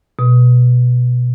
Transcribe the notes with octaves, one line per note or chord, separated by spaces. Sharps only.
B2